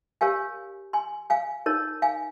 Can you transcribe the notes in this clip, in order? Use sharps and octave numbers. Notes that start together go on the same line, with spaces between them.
G4 A#4 C#5 F5 G#5
G#5 C6
F5 G#5
D#4 A#4 C#5
F5 G#5